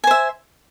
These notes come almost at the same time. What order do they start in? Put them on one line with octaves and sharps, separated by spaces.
G#5 C5 E5